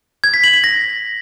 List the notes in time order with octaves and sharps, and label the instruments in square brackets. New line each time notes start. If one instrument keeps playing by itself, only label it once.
[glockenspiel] G#6
B6
F#7
F#7
A#6